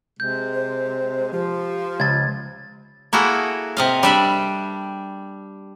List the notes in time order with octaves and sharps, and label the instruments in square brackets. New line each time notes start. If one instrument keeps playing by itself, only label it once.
[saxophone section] C3 G#3 [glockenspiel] G6
[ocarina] C5
[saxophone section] F3 [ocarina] G4
[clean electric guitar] C#2 [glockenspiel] G#6 A6
[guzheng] A#3 E4 F#4 G#4 A4
C3 D#5 F5
G3 D4 E5 G5 B5